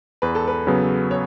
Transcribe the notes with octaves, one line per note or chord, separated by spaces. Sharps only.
E2 B4
A4
B4
C#3 F#3 B3
C#5